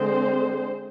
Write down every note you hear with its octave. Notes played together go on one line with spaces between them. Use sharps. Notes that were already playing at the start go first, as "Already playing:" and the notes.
Already playing: D3 G#3 C4 C5